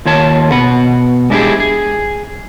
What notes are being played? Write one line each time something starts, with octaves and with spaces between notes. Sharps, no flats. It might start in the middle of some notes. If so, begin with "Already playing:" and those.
D#2 F4 C#5 A5
B2 F#5 B5
G#3 D4 E4 F4 G4 G#4
G#4